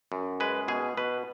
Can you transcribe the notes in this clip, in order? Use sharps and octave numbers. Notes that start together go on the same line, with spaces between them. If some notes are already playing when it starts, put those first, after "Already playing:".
F#2
G#3 B4
B2 G#4
B2 B4